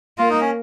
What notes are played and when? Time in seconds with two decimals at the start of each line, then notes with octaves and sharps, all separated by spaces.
0.18 A#3 F4
0.30 D#4
0.41 C#4